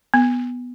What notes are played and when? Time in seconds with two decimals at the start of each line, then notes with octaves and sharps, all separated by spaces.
0.14 B3